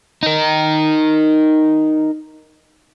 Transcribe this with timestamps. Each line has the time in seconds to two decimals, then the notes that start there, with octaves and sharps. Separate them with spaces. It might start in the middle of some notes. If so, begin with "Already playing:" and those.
0.23 D#4 A#4